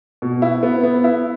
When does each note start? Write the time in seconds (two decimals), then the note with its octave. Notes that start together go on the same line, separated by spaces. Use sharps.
0.22 B2
0.42 E4
0.63 B3
0.84 B3
1.04 E4